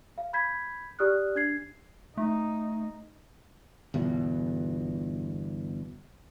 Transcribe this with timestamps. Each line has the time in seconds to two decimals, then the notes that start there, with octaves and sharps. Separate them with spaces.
0.18 F5
0.33 B5 G6 G#6 B6
0.99 G4 D5 D#6 F6 F#6
1.35 D4 G#6 C7
2.17 A3 D#4
3.94 G1 E2 B2